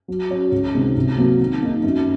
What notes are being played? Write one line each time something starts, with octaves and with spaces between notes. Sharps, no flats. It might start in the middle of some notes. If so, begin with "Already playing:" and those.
F#3
C#4 F#4 C#5
C#2
C3 D#3 G#3
C2
C3 F#3 A#3
D#3
A#3 D#4
F#2